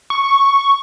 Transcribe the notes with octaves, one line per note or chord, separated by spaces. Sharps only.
C#6